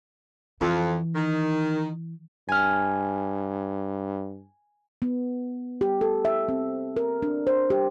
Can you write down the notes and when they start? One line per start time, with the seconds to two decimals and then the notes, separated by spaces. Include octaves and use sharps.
0.61 F2 E3
1.15 D#3
2.49 G2 G#5 F6
5.02 B3
5.81 G4
6.01 A4
6.25 E5
6.49 C4
6.97 A#4
7.22 D4
7.47 C5
7.70 G4